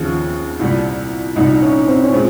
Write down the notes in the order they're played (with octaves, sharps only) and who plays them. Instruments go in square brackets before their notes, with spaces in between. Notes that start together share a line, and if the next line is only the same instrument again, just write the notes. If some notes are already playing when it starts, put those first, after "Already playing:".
Already playing: [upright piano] D#2 C#3 F3 C4
C2 A#2 G3
[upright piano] C2 A#2 G3 [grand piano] D#4
[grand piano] C#4
C4
C#4
[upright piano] A#2 G#3 [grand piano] C4